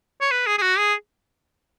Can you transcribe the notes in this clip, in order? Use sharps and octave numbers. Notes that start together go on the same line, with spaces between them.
C#5
B4
G#4
G#4
F#4
G#4